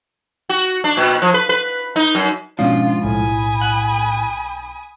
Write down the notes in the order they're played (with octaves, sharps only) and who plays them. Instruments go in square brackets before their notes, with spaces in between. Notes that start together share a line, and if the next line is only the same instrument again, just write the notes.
[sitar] F#4
D4
A#2
F3
B4
B4
D#4
F#2
[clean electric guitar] G#2 F3 [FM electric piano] B2 C#4 D4 [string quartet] F4 [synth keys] F5
[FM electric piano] B1 [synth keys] A2 [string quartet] G#5 B5 D#6
[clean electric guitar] F#5